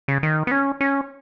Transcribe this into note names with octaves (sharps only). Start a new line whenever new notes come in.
C#3
D#3
B3
C#4
C#4